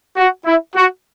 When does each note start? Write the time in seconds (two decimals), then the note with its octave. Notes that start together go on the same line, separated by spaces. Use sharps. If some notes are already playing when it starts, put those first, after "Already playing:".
0.17 F#4
0.46 E4
0.75 F#4